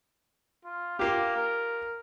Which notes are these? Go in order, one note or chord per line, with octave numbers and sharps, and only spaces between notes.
F4
A#3 F4 G4
A#4